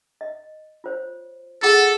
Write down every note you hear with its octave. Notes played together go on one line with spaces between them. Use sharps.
D#5
F4 C5 C#5
F4 G#4 A4 F#5